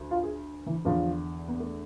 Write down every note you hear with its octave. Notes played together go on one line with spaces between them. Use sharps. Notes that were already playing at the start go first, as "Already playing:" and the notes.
Already playing: D2
F4
G#4
E3
E2 D3 F3
B3
A3